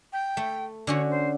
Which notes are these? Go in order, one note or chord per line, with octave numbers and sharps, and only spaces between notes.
G5
A3
D3 C#4 F#4 C#5
C5